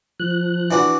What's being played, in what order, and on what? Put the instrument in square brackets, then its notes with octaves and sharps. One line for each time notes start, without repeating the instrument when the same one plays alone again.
[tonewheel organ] F3 F#6
[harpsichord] E3 D4 F#4